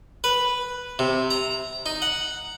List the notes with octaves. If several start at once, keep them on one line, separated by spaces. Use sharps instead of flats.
B4
C3
A#5
D#4
F#5